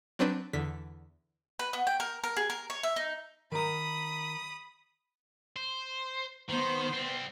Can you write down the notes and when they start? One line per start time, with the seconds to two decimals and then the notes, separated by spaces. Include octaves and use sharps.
0.19 F#3 C4 D4 B4 G6
0.53 E2 D3 B6
1.59 B4
1.73 B3
1.87 G5
2.00 A#4
2.24 A#4
2.37 G#4
2.50 A#4
2.70 C#5
2.83 E5
2.96 D#4
3.52 D#3 A#5 B5 D#6
5.56 C5
6.49 D#3 B3 C5
6.93 G3 C4